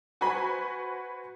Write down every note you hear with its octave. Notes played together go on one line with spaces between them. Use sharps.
F#4 B4 C5 G#5 B5 C#6